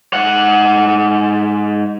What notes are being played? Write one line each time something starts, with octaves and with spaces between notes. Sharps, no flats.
G#2 F#5